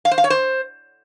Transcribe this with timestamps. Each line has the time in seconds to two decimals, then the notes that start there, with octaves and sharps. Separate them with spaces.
0.05 F5
0.11 C5
0.18 F5
0.24 C#5
0.30 C5